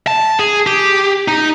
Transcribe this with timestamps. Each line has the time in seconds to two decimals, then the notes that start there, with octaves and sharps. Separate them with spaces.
0.07 A5
0.39 G#4
0.67 G4
1.28 D#4